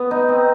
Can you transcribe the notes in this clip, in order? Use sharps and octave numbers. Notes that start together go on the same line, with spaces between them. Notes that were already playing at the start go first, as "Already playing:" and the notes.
Already playing: B3
D#4
C4